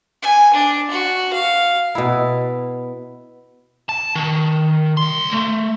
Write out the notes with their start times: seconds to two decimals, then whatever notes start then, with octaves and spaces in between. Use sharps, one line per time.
0.23 G#5
0.54 D4
0.91 F#4
1.33 F5
1.95 B2 E4
3.89 A5
4.15 D#3
4.97 C2 C6
5.31 A3